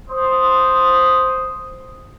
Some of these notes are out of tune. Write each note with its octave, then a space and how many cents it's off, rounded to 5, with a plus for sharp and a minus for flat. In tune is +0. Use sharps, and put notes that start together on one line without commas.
C5 +0 D#6 +0